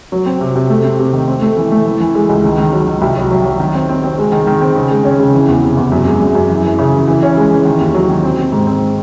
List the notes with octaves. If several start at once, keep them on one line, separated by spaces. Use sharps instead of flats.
F#3
C4
C3
C3
A3
C4
C3
D#3
C4
A3
E3
A3
E3
E3
G#3
C#2
D#3
D#3
F#3
D#3
C2
F#3
F#3
F#3
D#3
C4
C4
C4
G#3
D#3
D#3
C4
C#3
G#3
C#4
C#3
E3
E2
C3
E2
F#2
G#3
F#2
F#2
E3
E3
C#3
E3
E3
C#4
G#3
E3
D#3
D#2
F#3
D#3
C4
C4
G#2
C4